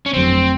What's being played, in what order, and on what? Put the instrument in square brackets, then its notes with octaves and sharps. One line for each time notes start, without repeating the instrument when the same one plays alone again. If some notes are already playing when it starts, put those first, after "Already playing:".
[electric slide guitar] C#4
[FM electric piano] G1 F2 D3 F#3 A3 [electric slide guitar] C4